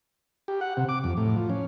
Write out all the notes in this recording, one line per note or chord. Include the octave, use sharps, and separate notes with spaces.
G4
F#5
C3
D6
F2
A2
F3
C#4